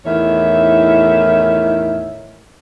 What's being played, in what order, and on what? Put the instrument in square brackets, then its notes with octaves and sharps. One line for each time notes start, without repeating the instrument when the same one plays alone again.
[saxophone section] E2 A2 D#3 C#5 E5